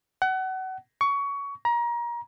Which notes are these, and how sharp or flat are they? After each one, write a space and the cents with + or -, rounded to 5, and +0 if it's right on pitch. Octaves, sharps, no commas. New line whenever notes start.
F#5 +30
C#6 +20
A#5 +30